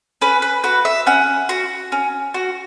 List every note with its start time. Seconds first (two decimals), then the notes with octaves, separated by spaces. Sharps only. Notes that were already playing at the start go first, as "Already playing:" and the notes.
0.22 C#4 B4
0.42 B4
0.64 F#4 B4
0.85 E5
1.07 C#4 F#5
1.49 F#4
1.92 C#4
2.34 F#4